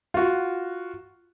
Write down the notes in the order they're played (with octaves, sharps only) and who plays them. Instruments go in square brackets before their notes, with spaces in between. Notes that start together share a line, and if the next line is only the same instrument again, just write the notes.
[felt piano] F4 F#4